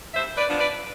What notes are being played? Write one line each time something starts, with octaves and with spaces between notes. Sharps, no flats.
G2 C5 E5
B4 D5
F3 B3 D4
B4 D5